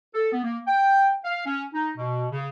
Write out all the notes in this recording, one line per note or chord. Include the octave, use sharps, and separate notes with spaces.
A4
B3
A#3
G5
F5
C#4
D#4
B2
C#3